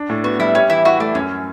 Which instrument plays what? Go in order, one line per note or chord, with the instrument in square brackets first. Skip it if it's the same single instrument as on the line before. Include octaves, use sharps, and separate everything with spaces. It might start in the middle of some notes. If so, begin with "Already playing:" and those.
Already playing: [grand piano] D4
A2
[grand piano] B3 [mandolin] F#4
[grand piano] G3 [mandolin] E4
[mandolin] C#4 [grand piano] G4
[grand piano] E3 [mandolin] E4
[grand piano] E4 [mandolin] F#4
[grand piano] A3 [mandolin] D4
[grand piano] F#2 [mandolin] C#4